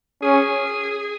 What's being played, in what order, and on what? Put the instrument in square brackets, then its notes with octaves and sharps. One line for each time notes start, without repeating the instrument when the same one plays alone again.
[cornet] C#4 [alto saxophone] G#4